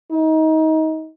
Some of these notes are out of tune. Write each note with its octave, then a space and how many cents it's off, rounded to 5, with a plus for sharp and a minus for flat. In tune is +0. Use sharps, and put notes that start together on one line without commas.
D#4 +25